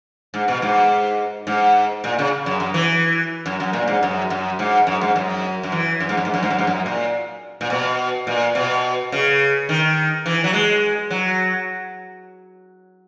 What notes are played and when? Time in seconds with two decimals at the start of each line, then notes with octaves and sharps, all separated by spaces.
0.34 G#2
0.48 B2
0.62 G#2
1.47 G#2
2.04 A#2
2.19 C#3
2.46 F#2
2.60 F#2
2.74 E3
3.46 F#2
3.60 F#2
3.73 A#2
3.88 G#2
4.03 F#2
4.30 F#2
4.59 G#2
4.87 F#2
5.01 G#2
5.16 F#2
5.63 F#2
5.72 E3
6.00 F#2
6.09 G#2
6.17 F#2
6.25 G#2
6.34 F#2
6.43 G#2
6.50 F#2
6.59 G#2
6.67 F#2
6.86 A#2
7.61 A#2
7.70 B2
8.27 A#2
8.55 B2
9.12 C#3
9.69 D#3
10.26 E3
10.44 F#3
10.53 G#3
11.11 F#3